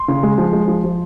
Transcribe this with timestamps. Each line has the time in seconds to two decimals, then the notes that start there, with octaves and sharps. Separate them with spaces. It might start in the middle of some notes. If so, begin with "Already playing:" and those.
Already playing: C6
0.08 C#3
0.23 G#3
0.38 F3
0.53 G#3
0.68 F3
0.84 F3